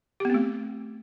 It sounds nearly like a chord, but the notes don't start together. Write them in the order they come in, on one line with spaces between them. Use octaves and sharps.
G4 B3 C4 A3